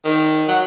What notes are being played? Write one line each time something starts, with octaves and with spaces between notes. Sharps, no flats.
D#3
F#3